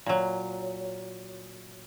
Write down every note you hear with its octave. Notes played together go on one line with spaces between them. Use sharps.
A#2 F#3